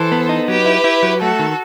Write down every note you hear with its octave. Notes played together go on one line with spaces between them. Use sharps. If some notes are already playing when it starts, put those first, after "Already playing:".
Already playing: E3 A4 C5
B3
D#4
F#3 G4 B4
E4
E4
F#3
A3 F#4 A4
D#3